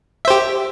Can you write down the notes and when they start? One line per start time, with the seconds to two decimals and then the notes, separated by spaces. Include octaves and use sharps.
0.25 E5
0.28 C5
0.30 G4